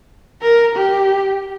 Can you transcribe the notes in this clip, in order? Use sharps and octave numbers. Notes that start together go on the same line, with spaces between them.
A#4
G4